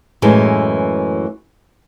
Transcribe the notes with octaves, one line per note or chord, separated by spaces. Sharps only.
F#2 A2 E3 G#3